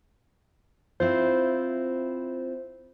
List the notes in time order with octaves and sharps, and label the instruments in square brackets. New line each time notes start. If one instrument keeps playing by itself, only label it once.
[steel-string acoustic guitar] C4 E4 F4 [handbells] C5 E5